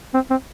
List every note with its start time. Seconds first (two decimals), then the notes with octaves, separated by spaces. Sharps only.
0.14 C4
0.30 C4